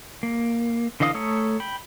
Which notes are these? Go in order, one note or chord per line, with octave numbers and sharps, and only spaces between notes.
A#3
D3 E3 D#5 F5 D#6
A3 A4 C#5 A#5 D#6
G5 B5